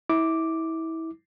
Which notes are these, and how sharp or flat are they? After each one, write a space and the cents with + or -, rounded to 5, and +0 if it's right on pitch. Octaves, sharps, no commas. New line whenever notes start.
E4 -25 D6 +0